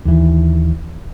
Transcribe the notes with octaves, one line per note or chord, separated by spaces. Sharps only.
D#2 E3